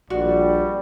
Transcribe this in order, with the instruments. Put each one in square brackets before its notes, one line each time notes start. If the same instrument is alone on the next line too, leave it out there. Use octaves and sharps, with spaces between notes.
[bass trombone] A#1 [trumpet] G3 [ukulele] F#4 [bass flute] D5